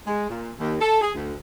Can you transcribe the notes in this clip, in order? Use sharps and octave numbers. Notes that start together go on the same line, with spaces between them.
G#3
A#2
D#2
A4
G#4
D2